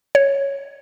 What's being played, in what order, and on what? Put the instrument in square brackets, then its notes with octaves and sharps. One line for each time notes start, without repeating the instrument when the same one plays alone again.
[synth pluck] C#5